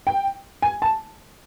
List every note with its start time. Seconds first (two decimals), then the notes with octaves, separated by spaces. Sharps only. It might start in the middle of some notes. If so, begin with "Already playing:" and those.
0.07 G5
0.62 G#5
0.82 A5